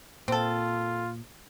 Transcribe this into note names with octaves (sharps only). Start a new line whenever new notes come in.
A#2 C4 F4 A4